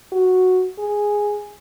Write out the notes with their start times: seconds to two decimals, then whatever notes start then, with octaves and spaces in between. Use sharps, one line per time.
0.13 F#4
0.79 G#4